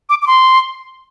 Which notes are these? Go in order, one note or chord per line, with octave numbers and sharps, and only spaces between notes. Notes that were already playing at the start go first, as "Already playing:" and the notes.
D6
D6
C6